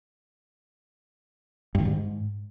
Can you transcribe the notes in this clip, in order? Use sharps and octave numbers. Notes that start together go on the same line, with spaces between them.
G2
D#3
G#2